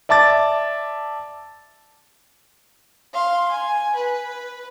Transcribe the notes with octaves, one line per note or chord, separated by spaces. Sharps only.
D5 E5 A5 D6 A6
F5 C6
G#5
B4